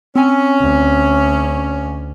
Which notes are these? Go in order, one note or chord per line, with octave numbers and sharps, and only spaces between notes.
C4 C#4 G#5
D2